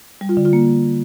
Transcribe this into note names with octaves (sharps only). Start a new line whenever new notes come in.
G3
F4
D3
F4
A#3